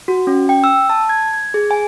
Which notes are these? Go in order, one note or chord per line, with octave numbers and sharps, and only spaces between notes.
F#4
C#4
G5
E6
A5
G#6
G#6
G#4
G#5